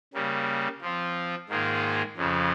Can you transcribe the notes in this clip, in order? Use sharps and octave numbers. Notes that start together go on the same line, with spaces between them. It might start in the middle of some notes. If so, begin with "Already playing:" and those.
C#3 G3 A#3
F3 C4 F4
G#2 D#3 A#3 F4 G#4
F2 C#3 F3